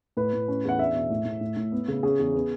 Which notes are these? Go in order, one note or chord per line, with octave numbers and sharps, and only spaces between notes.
A2 B4
A2
C#4
E2 F#5
D4 E5
B2
A2
A2
A2
A2
B3
C#3
C#4 G#4
E2
B3